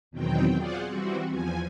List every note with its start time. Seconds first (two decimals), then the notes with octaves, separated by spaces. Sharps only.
0.11 E2 B2 D#3 F#3 C4 G5
0.56 F4 G#4 C5 D5 F#5
0.87 E3 G3 C4 F#4
1.30 E2 F3 G#5